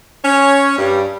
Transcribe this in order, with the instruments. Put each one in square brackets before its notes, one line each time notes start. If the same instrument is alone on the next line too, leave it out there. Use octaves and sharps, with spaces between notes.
[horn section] C#4 C#5
G2 G3